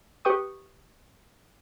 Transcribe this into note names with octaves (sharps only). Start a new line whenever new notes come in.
G4 B4 G5 C#6 D#6